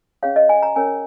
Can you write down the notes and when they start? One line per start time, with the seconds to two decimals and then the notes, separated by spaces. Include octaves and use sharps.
0.23 C#4 G#4 C#5 F5
0.36 D#5
0.49 G#5
0.63 A#5
0.76 C#4 A#4 C#5 G#5